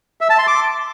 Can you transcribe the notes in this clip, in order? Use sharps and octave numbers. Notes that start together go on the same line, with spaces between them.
E5
A5
C6
D6